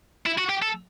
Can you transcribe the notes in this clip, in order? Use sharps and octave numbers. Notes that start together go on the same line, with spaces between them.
E4
F#4
G4
A4